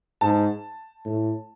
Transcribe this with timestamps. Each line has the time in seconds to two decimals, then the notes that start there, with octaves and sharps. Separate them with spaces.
0.21 G#2 A5
1.05 A2